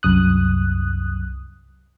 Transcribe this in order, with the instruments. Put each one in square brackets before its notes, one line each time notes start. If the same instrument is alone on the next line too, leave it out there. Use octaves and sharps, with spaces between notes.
[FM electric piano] C2 F#2 D#6 F#6